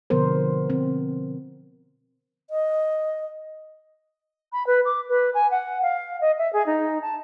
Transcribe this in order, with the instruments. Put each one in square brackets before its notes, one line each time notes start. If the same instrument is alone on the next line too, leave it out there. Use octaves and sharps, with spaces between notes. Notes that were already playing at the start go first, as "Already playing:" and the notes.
[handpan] B2 D3 F3 B3 A#4 C5
C4
[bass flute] D#5
[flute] B5
B4
D6
B4
G#5
F#5
F5
D#5
E5
G#4
D#4
A5